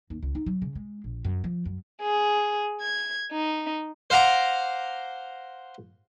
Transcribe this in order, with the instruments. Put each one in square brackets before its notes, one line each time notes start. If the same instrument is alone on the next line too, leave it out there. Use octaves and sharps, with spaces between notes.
[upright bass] D#2
C#2
D#4
F#3
C#3
G#3
A#1
F#2
F3
F#2
[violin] G#4
G#6
D#4
[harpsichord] C5 F5 F#5 A#5 D6